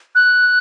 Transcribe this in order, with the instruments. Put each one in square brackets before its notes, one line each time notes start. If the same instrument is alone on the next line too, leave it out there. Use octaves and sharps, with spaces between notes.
[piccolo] F#6